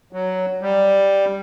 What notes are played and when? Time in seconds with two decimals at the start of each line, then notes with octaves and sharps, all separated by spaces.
0.13 F#3
0.61 G3